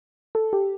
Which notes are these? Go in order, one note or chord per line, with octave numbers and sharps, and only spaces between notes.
A4
G4